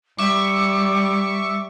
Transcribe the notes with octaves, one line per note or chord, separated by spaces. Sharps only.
G3 E5 C#6 D6